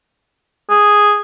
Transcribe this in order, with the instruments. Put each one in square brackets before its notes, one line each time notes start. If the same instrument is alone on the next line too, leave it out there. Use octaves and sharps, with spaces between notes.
[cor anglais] G#4